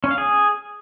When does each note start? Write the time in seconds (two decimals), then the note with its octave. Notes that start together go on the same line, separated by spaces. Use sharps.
0.04 C#4
0.11 F5
0.18 G#4